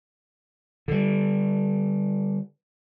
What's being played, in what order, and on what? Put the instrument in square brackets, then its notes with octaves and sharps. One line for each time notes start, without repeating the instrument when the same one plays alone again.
[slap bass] D3 G3